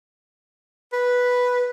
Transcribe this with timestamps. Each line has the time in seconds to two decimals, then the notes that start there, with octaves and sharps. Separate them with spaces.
0.93 B4